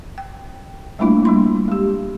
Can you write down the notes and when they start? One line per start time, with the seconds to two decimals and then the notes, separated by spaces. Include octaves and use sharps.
0.18 G5
0.99 G3 A3 A#3 D4 E4 F4
1.25 G3 D4 C6
1.68 G#3 G4